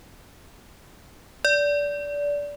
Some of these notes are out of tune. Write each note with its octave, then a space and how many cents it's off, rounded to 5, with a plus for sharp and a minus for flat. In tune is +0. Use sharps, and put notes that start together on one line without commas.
D5 -20